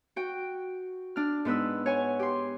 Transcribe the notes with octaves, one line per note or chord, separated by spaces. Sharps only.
F#4 G5
D4 F6
G#2 B3 B4 E6
C#5 F#5 G#5 C#6
G4 C6